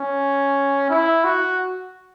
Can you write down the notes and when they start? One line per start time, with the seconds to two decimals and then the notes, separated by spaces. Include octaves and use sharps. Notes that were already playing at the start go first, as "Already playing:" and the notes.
Already playing: C#4
0.90 E4
1.24 F#4